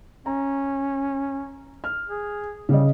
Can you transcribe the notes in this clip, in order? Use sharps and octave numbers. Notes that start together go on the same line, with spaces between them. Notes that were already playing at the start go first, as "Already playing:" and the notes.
C#4 A#5
F6
G#4
C#3 G3 D#5